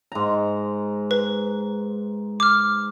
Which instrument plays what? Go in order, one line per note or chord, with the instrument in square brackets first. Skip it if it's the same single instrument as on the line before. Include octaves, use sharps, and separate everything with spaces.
[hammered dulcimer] G#2 A#5
[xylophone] B4
D6 F6